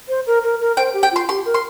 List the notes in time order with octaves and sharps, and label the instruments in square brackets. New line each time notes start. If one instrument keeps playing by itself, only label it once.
[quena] C5
A#4
A#4
A#4
[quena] C5 [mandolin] G5
[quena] G4
[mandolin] G5
[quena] F4 [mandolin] C6
[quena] G4 [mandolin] C6
[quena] A#4
[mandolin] C6